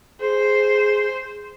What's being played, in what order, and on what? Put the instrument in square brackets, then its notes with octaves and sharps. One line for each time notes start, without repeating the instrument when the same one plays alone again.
[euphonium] G#4 [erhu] C5